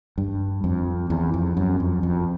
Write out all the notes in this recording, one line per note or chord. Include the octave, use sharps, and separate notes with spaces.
G2
F2
E2
F2
F#2
F2
F2